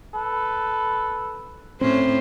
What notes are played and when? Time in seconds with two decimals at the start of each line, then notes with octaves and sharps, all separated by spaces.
0.13 A4 B4
1.81 A2 C4 C#4 C5